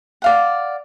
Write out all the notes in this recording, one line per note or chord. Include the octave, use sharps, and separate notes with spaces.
D5 F5 F#5